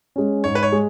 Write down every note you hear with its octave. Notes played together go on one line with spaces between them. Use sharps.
G#3 C#4
G#2 C#5
B4
C#5
G#3